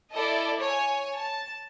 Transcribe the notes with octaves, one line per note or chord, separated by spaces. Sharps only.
E4 A4 D5 D#5
C#5 G#5
A5